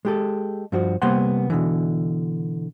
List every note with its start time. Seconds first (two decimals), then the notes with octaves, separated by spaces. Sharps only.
0.05 G#3 G4 A4
0.72 G2 F3 F#4
1.02 C3 G3 A#3 B3 F#5 C6
1.50 B2 D3 E3